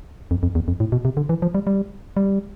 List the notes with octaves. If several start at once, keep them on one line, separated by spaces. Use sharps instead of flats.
F2
F2
E2
F2
A2
B2
C3
D3
E3
F3
G3
G3
G3